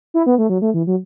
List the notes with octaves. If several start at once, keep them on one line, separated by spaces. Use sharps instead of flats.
E4
B3
A3
F#3
A3
E3
F#3